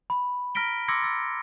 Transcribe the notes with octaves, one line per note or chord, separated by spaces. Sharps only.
B5
A#5 F6 A#6 B6 D7 G7
C6 D6 E6 G#6 A#6 C#7
E6 A6